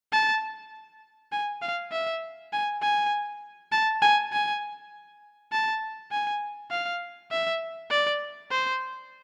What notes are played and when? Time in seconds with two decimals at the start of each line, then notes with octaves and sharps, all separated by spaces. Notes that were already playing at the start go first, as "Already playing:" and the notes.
0.13 A5
1.32 G#5
1.62 F5
1.92 E5
2.53 G#5
2.82 G#5
3.72 A5
4.02 G#5
4.32 G#5
5.52 A5
6.12 G#5
6.71 F5
7.32 E5
7.91 D5
8.51 C5